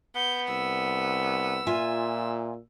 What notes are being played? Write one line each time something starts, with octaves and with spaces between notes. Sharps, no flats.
B3 G6
C2 E6
A#2 F4 E5 G#5